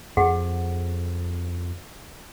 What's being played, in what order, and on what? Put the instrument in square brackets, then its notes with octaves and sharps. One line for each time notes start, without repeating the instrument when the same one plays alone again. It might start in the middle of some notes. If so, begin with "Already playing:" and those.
[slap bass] F2 [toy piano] G4 G#4 F#5